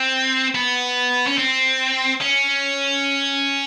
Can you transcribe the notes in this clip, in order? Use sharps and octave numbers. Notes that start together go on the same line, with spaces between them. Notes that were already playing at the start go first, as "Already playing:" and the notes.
Already playing: C4
B3
C#4
C4
C#4